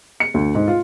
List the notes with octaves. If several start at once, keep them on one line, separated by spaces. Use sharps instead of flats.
C#7
D2
G#2
F4